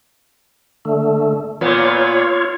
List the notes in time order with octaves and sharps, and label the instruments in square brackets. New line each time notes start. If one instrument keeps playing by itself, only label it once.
[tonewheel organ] D3 A3
[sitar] A#2 B3 [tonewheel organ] F4 C#5